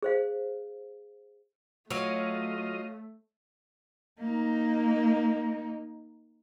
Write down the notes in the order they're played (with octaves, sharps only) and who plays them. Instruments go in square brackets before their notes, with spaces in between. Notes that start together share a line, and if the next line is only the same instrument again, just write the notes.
[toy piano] G#4 C5 F5
[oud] F#3 [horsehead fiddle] A3 [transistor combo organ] F4 D#5 [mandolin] C#5 F5
[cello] A#3 D#4